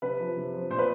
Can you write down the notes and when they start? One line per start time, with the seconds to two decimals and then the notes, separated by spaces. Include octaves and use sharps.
0.02 C3 B4
0.19 F3
0.37 C3
0.54 F3
0.70 A#2 C5
0.78 B4